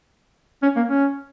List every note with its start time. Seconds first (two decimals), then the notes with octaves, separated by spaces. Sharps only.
0.62 C#4
0.76 A#3
0.89 C#4